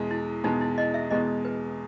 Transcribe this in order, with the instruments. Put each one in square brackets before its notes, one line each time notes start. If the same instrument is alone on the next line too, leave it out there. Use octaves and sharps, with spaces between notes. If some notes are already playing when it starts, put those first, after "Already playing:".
Already playing: [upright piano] E2 B2 G#3
[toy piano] E4
[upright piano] E2 B2 G#3 [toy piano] D#4
[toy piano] E4
D#5
E5
[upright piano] E2 B2 G#3 [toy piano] D#5
[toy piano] B4